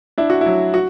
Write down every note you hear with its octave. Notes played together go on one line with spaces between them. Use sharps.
D4 E4
F#4
F#3 E4
F#4